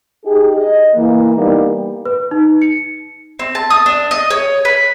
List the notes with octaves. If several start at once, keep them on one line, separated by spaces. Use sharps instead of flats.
D#4 G4 G#4
D#5
E3 A#3
E3 G3 A#3 B3 D#4
B4
D#4
C#7
C4
A5
D#6
D4
D#5
C#5
B4